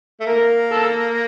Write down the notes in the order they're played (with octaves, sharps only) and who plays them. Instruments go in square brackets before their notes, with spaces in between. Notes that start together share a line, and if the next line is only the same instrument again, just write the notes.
[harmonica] A3
[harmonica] A#3 [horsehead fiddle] A#4
[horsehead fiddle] A4